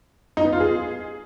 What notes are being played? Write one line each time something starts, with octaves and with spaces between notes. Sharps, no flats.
D#4
B3
F4
G#4